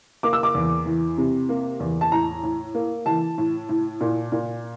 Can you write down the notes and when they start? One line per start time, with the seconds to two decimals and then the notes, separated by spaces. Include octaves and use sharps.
0.23 A#3 D6
0.33 E6
0.43 D6
0.55 E2
0.86 E3
1.18 C3
1.49 A#3
1.80 E2
2.01 A5
2.12 A2 A#5
2.43 A2
2.75 A#3
3.06 E3 A5
3.38 A2
3.69 A2
4.01 A#2
4.32 A#2